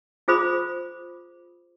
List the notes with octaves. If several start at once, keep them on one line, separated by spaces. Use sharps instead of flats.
F4 G#4 C5 B5 D#6